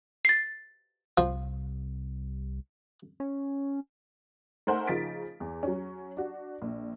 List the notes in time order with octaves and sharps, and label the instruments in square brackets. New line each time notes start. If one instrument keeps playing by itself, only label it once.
[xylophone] A6 C7
[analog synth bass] C2 [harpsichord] F3
[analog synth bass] C#4
[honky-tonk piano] A3 D#4 A#4 C5 F#5 G#5
C#3 F3 D#4 A6 B6 D7
E2
F#3 C#4
D4 F#4
A#1